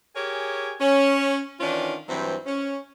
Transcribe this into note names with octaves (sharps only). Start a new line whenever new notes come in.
G4 G#4 A#4 C#5 G#5
C#4
D#3 E3 C#4 D4 F4
G2 E3 F#3 C4
C#4